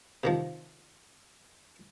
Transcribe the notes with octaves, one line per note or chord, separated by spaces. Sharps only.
C3 D#3 F3